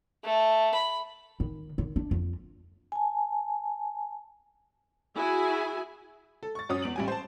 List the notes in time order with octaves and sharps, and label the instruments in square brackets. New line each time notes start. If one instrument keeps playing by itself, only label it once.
[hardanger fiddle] A3
B5
[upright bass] D#3
D#3
D4
F2
[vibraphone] G#5 A5
[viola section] E4 F#4 G#4 E5 G#5
[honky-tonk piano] A4
C#6 A6
F#2 C#4 D#6
E2 D7 F#7
A1 G3 G#5
C5 A5